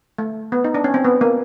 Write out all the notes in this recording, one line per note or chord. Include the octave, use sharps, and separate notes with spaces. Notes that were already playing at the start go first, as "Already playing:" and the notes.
A3
B3
D#4
D4
C#4
C4
B3
A#3